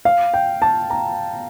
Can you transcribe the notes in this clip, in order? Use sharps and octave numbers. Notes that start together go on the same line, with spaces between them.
F5
G5
A5
A#5